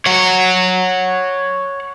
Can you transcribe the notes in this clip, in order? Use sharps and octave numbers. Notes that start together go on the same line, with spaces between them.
C#5 F#5